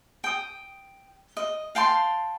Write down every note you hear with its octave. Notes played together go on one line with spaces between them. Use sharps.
G5 D#6
D#5
F5 G5 A5 C6